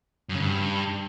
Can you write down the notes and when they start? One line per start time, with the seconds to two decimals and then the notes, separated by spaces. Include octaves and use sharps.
0.29 F#2
0.35 C#3
0.40 G2